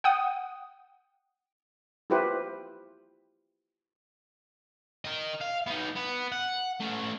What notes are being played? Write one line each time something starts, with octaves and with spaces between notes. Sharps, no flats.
F#5 G5 D#6
E4 F4 G4 B4 C5
A#4 D#5
F5
B3 D#4
B3
F#5
A3 C#4